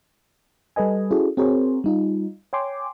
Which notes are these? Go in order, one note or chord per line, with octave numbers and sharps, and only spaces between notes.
G3 A4 B4 D#5 G#5
C#4 E4 F#4 G#4 A4
C4 F#4 G#4 A#4 C5 C#5
G3 D#4 F4
C#5 G5 G#5 C6 D6